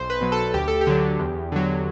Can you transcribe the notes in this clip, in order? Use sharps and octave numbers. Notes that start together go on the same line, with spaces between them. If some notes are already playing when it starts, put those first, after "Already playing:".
Already playing: B1 C5
B4
B2 F#3
A4
D2 G4
A4
G4
D3 F#3
E2
D3 F#3